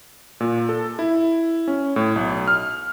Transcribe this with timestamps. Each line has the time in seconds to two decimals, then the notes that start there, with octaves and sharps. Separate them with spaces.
0.40 A#2
0.69 A4
0.99 E4
1.68 C#4
1.96 A2
2.16 B1
2.48 F6